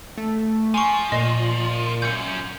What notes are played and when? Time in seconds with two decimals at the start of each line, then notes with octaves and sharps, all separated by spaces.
0.18 A3
0.74 F3 G#5 C#6
1.12 A#2 D#5
2.02 F#2 C#4 G6 C#7